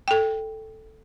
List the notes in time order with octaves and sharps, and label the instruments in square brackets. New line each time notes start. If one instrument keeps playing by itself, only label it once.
[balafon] A4 G5